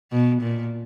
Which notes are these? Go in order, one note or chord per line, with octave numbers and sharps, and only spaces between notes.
B2
A#2